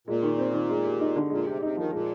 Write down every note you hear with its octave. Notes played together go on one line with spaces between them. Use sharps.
A#2 G#3
D#3
C4
D#3
G#3
G4
D#4
D3
A#2 G#3
C3 G4
A#2
C3 D#4
D#3 F3
A#2 G#3